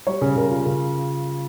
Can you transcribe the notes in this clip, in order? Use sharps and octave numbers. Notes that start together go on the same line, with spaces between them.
G3 C#5
C#3
C#3 A#4
F4
C#3